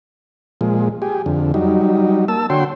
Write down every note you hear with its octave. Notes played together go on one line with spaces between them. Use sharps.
A#2 F3 G#3
G4 G#4
F2 D3
F#3 G3 D#4
A#3 A5 E6
D3 F#4 C#5 G5 C6